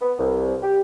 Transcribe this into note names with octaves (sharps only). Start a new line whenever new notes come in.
B3
C2
G4